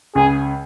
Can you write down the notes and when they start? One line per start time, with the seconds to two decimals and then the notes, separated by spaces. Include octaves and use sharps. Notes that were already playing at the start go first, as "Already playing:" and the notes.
0.15 C#2 C#3 G#4